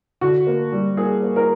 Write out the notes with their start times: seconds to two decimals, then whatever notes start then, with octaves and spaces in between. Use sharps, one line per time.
0.21 D3 F#4
0.47 A#3
0.72 G3
0.97 A#3 G#4
1.22 A#3
1.36 A#4